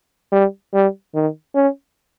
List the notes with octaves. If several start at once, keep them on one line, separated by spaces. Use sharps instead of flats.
G3
G3
D#3
C#4